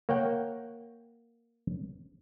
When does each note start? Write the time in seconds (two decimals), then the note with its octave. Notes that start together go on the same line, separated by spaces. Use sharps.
0.09 A#3 C#5 F#5 G5